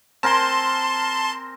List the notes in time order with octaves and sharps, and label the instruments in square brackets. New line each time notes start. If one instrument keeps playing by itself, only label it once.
[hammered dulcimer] C4 A#4 G#5 [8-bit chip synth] A5 C6